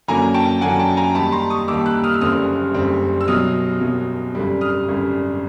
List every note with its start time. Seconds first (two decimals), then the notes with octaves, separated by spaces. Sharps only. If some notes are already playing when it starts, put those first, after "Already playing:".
0.08 F#2 D3 F#3 A#3 G#5 A#5
0.34 G5 A5
0.61 F#2 D3 F#3 A#3 F#5 G#5
0.79 G5 A5
0.97 G#5 A#5
1.15 D#2 D#3 G3 A5 B5
1.32 A#5 C6
1.50 C#6 D#6
1.68 D#2 D#3 G3 D6 E6
1.86 E6 F#6
2.04 D#6 F6
2.14 E6
2.21 F#1 F#2 D3 G3 C4 D#6 F6
2.74 F#1 F#2 D3 G3 C4
3.21 E6
3.28 C2 B2 F#3 D#6 F6
3.81 C2 B2 F#3
4.35 G#1 F#2 D3 G3
4.61 D#6 F6
4.88 G#1 F#2 D3 G3